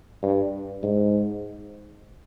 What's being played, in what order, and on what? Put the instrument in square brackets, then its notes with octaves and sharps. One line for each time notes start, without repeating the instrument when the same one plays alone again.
[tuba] G2
G#2